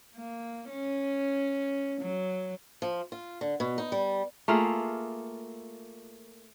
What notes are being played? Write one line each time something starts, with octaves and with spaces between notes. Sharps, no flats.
A#3
C#4
F#3
F3
F4
D3
B2
D#4
G3
A3 A#3 F4 G#4